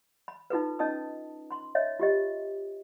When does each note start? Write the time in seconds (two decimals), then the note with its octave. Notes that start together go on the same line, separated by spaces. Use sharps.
0.28 B5
0.50 D#4 F4 A4 B4
0.79 C#4 D#4 D#5 A5 D#6
1.51 B5 C6
1.75 C#5 D#5 E5
1.99 F4 G4 D#5